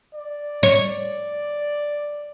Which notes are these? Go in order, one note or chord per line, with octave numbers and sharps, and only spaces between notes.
D5
C#5